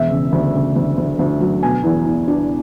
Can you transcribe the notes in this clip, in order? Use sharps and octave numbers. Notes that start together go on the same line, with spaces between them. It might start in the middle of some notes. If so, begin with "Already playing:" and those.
Already playing: E1 E5
C#3
D2
C#3
D2
D2
D2
F#3
B2 G#5
E2
E2
D4